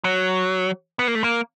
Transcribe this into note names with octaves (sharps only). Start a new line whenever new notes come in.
F#3
B3
A#3
A3
A#3